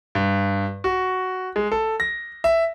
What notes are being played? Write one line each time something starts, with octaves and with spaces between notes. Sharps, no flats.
G2
F#4
G#3
A4
A#6
E5